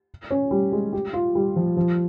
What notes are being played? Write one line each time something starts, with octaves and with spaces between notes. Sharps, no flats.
C#4
G3
G#3
G4
F4
G3
F3
F3